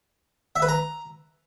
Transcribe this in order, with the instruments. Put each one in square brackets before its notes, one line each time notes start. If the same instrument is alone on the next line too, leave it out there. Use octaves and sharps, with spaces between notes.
[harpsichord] E5
B4
A#5